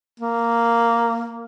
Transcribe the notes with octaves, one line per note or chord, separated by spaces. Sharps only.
A#3